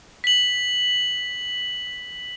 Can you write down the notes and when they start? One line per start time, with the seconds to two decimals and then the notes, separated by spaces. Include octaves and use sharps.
0.24 B6 F#7